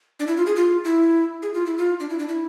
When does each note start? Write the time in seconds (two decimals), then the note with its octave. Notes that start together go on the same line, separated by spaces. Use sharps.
0.20 D4
0.27 E4
0.37 F4
0.46 G#4
0.56 F4
0.84 E4
1.42 G#4
1.54 F4
1.66 E4
1.78 F4
2.00 D4
2.09 E4
2.19 D4
2.28 E4